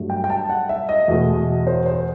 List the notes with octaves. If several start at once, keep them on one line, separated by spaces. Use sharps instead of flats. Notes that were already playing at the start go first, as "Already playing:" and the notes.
Already playing: G2 F#3 A3
G5
G5
A5
F#5
E5
D#5
E2 B2 A3
C5
C5